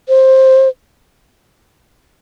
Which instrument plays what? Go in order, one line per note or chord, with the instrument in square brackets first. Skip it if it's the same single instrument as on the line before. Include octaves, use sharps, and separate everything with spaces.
[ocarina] C5